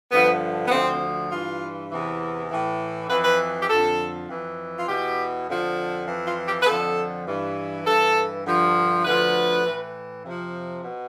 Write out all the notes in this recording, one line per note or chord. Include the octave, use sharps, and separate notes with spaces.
G2 D3 F3 B3
B3
D2 D3 F3 C4
G2 E3 F4
E2 C3 E3
A2 E3
F2 E3 B4
B4
G4
F2 D3 F3 A4
F2 E3
F4
E2 B2 G4
F2 D3 F3
F2 E3
F4
G4
B4
F2 D3 F3 A4
G2 E3
G2 E3 A4
G2 D3 F3
D2 D3 F3 B4
A2 E3
F2 C3 F3
B2